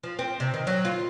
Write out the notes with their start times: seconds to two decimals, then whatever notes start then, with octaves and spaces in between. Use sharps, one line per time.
0.03 F3
0.19 C4
0.40 C3
0.54 D#3
0.67 F#3
0.85 F4